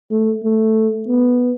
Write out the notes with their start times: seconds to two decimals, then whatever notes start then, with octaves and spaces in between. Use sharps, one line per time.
0.11 A3
0.43 A3
1.08 B3